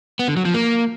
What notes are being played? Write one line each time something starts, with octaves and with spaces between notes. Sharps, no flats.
B3
D3
F#3
F3
A#3